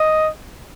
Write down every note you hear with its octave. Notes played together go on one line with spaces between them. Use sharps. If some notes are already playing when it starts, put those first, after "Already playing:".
Already playing: D#5